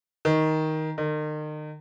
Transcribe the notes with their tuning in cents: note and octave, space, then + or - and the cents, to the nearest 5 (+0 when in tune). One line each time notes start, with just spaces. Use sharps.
D#3 +10
D#3 -35